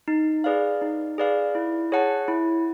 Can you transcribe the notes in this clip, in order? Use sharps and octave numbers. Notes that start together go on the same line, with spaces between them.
D#4
G#4 B4 D5 F5
D#4
G#4 B4 D5 F5
E4
G#4 C#5 F#5 A5
E4